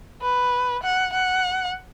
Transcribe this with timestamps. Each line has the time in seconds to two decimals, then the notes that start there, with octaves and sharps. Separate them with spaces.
0.22 B4
0.83 F#5
1.13 F#5